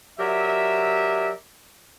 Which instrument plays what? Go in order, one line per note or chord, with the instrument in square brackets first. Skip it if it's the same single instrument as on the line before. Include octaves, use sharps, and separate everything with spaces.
[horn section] F#3 G4 A#4 D5 E5